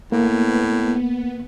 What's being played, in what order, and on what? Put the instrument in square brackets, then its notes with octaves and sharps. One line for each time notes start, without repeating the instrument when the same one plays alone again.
[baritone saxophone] A2 [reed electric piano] A#3 [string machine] B3